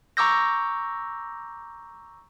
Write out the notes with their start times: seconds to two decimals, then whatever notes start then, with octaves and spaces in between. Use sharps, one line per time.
0.17 A#5 C#6 D6 E6 G6 A#6